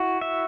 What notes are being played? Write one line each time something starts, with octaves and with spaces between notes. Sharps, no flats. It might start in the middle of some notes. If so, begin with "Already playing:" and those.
Already playing: E4 F#4
E5